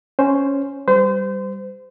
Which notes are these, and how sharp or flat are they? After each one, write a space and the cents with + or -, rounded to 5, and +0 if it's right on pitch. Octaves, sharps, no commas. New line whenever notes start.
C#4 +0 C5 +0
G3 -5 C5 -35